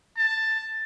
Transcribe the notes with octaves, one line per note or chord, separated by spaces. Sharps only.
A5